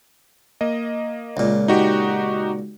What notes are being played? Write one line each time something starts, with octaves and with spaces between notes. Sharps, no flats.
A#3 D#5
C#2 A#2
D#4 F#4 G4